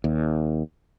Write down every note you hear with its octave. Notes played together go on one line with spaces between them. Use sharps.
D#2